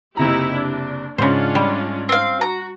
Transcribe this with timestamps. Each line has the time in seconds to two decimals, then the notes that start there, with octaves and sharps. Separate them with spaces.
0.17 F#1 C3 D#4 E4 G4 A#5
0.53 D4
1.18 G#2 C#3 C#4 D4 F4 C5
1.55 G3
2.09 C4 F5
2.41 F#4 A#5